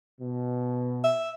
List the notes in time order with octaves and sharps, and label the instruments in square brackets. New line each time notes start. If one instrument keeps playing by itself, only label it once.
[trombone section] B2
[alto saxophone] E5